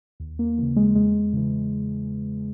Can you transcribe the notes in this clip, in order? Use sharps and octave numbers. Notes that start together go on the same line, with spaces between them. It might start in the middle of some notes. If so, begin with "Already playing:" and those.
D#2
A#3
C#3 E3 A#3
G#3
E2 G#3
C#3 E3